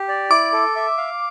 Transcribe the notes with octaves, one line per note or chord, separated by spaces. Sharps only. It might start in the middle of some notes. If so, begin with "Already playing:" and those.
Already playing: G4
D5
E4 D6
A4
E5
F5